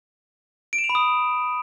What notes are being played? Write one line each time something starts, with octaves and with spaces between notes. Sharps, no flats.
D7
E7
F7
B5
D#6